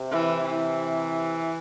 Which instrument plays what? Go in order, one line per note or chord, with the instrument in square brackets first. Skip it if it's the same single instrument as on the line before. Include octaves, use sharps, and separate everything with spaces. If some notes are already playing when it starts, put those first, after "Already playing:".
Already playing: [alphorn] C3
[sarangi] E3
E3